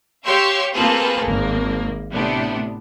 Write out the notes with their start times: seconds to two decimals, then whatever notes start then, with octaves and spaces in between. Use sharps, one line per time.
0.25 G4 C#5 F5 C6 C#6 E6
0.74 A#3 C4 F4 G#4 A4 B4
1.24 G#1 A#3
2.13 A2 C3 B3 D4